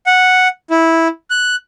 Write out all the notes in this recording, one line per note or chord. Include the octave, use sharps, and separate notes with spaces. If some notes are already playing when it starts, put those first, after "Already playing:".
F#5
E4
F#6